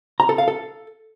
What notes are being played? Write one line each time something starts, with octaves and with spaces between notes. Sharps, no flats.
A#5
A4
F5
A4